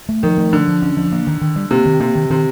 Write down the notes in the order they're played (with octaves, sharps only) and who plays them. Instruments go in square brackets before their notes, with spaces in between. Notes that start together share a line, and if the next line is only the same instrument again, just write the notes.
[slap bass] A3
[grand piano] D#3 [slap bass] F3
[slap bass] A3
[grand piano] D3 [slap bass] F3
[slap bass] F3
C#4
F3
A#3
D#3
D#3
G3
[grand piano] C3 [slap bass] A#3
[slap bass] D#3
[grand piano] C3 [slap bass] A#3
[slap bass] D#3
[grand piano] C3 [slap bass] D#3